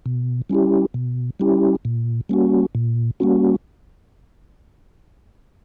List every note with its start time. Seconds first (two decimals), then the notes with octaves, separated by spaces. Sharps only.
0.06 B2
0.50 G3 C#4 E4 G4
0.94 B2
1.40 G3 C#4 E4 G4
1.85 A#2
2.29 G3 A#3 C#4 F#4
2.75 A#2
3.20 G3 A#3 C#4 F#4